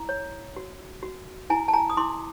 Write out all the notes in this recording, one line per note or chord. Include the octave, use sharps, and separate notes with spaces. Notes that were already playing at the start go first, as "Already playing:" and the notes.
Already playing: E4 A#5
C#5
F#4
F#4
E4 G#5 A#5
A5
G#5 A#5
D#6
E4 C6 D6